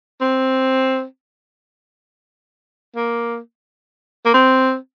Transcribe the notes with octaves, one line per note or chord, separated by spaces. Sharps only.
C4
A#3
A#3
C4